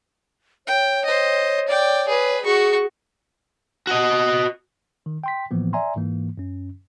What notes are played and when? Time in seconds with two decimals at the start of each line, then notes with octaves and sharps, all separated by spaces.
0.67 C#5 G5
1.05 C5 D#5
1.68 D5 G5
2.08 G#4 B4
2.44 F#4 G#4 C#6
3.87 F#4 D#5
5.06 D#3
5.24 G5 C6 B6
5.51 A2 E3 F3 A#3 B3
5.73 D5 E5 G#5 A#5 C6
5.96 G#2 E3 A#3
6.37 F#2 C#4